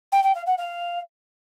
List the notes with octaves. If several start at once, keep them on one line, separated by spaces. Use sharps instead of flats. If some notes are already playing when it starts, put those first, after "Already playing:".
G5
G5
F5
F#5
F5